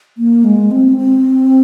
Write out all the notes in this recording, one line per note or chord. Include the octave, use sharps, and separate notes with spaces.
A#3
G#3
C4
C4